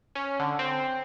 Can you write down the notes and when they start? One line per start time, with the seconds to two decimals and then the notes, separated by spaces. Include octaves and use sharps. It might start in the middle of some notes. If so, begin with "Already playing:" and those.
0.15 C#4
0.39 D3
0.59 C4